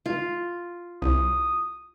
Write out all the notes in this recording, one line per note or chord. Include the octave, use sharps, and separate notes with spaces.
F4
C2 D#6